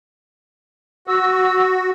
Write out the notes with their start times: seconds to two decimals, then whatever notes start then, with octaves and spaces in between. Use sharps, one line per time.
1.07 F#4 E6